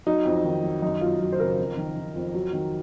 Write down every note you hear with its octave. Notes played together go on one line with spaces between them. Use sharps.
F#3 D#4
F2
D#3
F#3
F#2 D#4
F#2 F4
F#3
C5
C#3 A#4
F2
D#3
D#3
F2
F#3
D#3